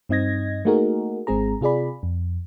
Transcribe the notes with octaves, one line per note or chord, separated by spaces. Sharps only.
G2 C4 D#4 D#5 G#6 A#6
A3 A#3 D#4 F#4 G#4 A#4
G#1 G#3 C4 G#4 A#5
C3 F4 G#4 D5 B5
F2